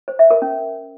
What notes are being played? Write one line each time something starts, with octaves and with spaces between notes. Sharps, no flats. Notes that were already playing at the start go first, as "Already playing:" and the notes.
C5
E5
A#4
C#4